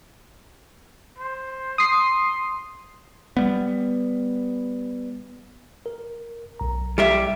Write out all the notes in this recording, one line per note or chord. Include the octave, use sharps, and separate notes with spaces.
C5
C6 D#6 C7
G3 B3
A#4
B1 A#5
G3 G4 E5